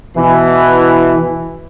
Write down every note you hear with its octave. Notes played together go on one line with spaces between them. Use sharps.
B2 E3